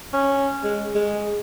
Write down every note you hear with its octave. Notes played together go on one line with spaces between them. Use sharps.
C#4
G#3
G#3